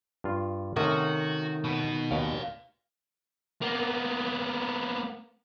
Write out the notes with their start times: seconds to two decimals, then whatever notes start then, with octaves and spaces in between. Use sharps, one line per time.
0.24 G2 F4
0.76 C3 D#3 A3 C#4 F#4
1.64 B2 B3
2.11 D#2 B2 D5 F5
3.62 A#3 B3